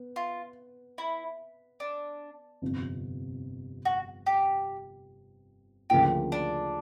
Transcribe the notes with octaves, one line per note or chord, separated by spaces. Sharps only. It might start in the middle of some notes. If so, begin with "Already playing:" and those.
Already playing: B3
F4
E4
D4
G1 F2 C3
F#4
G4
D2 C#3 F3 A#3 G4
D4